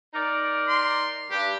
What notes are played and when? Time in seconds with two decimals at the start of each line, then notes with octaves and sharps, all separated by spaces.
0.14 D#4 A#4 D5
0.68 C6
1.31 G2 G4